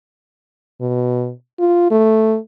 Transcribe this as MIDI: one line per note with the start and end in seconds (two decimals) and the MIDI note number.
0.81 1.31 47
1.59 1.90 65
1.91 2.37 57